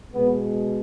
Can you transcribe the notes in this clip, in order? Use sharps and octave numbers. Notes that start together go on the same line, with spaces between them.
B2 G#3 B3